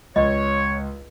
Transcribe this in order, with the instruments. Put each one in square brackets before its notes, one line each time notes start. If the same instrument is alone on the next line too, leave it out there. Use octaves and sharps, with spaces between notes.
[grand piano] C#2 [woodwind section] C#5 [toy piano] D#5